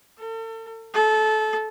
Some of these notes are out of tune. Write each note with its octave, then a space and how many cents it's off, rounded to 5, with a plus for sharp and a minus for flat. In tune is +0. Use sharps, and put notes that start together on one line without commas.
A4 +40
A4 -25